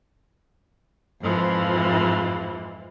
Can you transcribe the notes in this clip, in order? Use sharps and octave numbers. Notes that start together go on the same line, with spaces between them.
F2 G#2 E3 F3